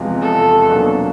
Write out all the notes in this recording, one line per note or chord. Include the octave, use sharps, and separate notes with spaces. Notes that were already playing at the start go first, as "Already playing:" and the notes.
Already playing: E2 C3 F3 G#3
A4
B2 F#3 A#3 D4